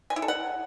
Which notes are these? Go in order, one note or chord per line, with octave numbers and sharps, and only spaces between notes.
G#5
E4
A4
F#5